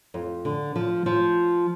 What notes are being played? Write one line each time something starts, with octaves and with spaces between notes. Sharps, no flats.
F2
D3
F3
F3